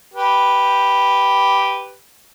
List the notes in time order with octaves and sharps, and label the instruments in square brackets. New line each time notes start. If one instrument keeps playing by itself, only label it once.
[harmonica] G4 B4